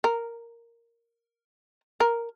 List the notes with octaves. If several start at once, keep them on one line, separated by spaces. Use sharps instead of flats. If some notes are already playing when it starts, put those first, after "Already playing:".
A#4
A#4